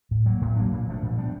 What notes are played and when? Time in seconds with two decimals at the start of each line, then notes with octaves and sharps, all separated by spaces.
0.11 A2
0.26 F#3 A#3
0.41 A2
0.57 F#3 A#3 D4
0.72 A#2
0.87 F3 A3 D4
1.03 A#2
1.17 G3 B3 D4